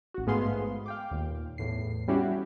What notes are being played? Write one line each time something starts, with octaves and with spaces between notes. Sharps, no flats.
A1 F#4
G#2 A3 B3 G#4 F5 C6
F5 G5 D6
D#2 A#2
E2 A2 C7
G3 B3 C#4 E4 F#4 G4